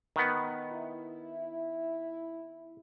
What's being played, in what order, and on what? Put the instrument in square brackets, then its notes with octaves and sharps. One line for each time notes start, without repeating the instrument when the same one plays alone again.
[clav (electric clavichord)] D#3 B3
[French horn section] E4